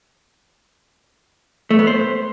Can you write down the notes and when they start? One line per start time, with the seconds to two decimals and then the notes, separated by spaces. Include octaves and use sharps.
1.70 A3
1.79 B3
1.87 C5